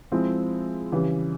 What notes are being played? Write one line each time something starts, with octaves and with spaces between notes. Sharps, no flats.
F3 G#3 C4 E4
C#3 E3 G3